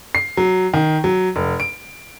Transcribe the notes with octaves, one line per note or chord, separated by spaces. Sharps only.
C7
F#3
D#3
F#3
F1
D7